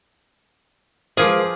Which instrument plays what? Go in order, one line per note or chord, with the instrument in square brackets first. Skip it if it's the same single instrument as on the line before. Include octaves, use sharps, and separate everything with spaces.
[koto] F3 G#4 [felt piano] G#3 B4 C5 [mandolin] A#3 F4 D6